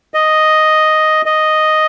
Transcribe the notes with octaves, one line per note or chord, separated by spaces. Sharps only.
D#5
D#5